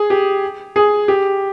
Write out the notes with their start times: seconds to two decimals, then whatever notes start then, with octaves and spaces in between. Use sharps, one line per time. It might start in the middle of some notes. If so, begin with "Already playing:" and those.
Already playing: G#4
0.10 G4
0.76 G#4
1.08 G4